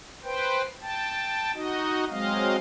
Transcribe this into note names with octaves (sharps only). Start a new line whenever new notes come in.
B4 C5 G5
G5 A5
D#4 F#4 D#5
F#3 G#3 C4 D#5 F5